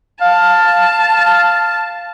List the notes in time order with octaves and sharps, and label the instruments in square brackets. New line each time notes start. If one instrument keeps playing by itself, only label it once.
[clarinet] F5 [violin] A5